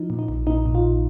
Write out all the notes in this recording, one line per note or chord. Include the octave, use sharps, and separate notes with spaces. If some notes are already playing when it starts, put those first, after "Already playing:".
Already playing: F3 D#4
A#2
D#4
A#1
A#2 D#4
A#2
F4
A#1